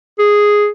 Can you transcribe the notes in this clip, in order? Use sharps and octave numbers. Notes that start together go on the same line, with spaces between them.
G#4